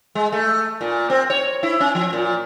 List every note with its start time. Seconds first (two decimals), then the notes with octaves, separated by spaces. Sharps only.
0.15 G#3
0.32 A3
0.81 A#2
1.10 C4
1.30 C#5
1.63 E4
1.80 C#4
1.95 F3
2.13 A#2